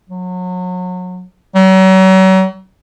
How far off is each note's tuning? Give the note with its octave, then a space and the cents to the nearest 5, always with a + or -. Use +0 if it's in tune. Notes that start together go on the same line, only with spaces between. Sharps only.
F#3 -30
F#3 +40